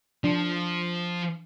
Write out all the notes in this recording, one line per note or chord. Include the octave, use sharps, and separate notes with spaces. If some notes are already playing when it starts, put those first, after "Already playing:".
F3 D4